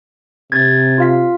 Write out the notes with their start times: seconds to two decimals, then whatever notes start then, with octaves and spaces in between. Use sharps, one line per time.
0.52 C3 G#6 A6
0.98 F4 F5 B6